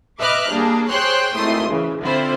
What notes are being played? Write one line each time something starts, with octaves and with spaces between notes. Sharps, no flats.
B4 D#5 E5 D6 F6 F#6
G3 A#3 D4 G#4
G#4 C5 C#5 G5 C6 F#6
G#1 A3 E4 C6 D#6
C#3 E3
D3 C4 E4 F4 C5